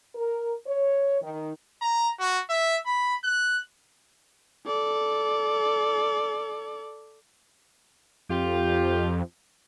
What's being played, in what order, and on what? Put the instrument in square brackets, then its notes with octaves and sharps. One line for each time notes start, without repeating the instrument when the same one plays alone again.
[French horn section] A#4
C#5
D#3
[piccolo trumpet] A#5
F#4
E5
B5
F#6
[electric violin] A4 D5
[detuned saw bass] F2 [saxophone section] F4 G4